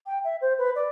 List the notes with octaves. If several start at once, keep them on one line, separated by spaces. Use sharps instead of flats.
G5
E5
C5
B4
D5